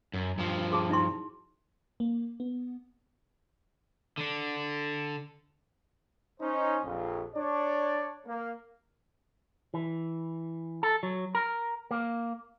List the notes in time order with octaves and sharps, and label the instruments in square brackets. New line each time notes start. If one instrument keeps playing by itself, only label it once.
[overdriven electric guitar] F#2
G2 F3
[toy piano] F#4 G#4 A5
D#4 E4 C6
[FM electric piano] A#3
B3
[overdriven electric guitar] D3 D4
[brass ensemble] C#4 D#4 C5
A#1 F2
D4 C#5 D5
A#3
[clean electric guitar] E3
A4
F#3
A#4
A#3